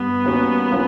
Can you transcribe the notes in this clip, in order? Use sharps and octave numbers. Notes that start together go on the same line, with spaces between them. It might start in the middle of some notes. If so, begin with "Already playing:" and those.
Already playing: G2 B3
D#3 G3 A#3 C#4 F#4
B2 F#3 A#3 C#4 F4